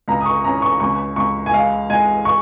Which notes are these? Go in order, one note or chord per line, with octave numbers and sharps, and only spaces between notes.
C#2 A#5
D#6
C#6
C#4 A#5
C#6
C#2 C#6
C#2 C#6
G#5
G#3 F5
G#3 G#5
C#6